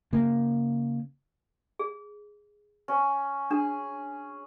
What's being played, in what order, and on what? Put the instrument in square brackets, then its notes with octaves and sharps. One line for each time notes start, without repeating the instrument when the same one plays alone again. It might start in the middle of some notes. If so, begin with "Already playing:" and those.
[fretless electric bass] C#3 A#3
[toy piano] G#4
[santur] C#4
[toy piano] D4 [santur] G#4